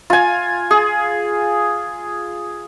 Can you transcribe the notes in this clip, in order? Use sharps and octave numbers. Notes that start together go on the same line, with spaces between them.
F4 G#5
G#4